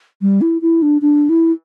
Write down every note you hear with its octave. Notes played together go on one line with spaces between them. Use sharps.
G3
E4
E4
D4
D4
E4